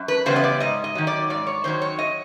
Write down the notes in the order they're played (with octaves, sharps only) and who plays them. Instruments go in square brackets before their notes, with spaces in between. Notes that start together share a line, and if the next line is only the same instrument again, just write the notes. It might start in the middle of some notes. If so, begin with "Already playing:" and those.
Already playing: [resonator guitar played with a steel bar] F#2
B4
C#3 E3 G3 B3 C5
D#5
D5
G#2 D#5
D#5
D#3 F#3
D5
G#2 D5
C#5
D#3 F#3 C5
C#5
D#5